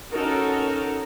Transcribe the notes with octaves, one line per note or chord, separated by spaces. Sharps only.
C#4 D#4 F#4 A4 A#4